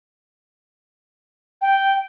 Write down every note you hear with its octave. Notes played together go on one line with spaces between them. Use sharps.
G5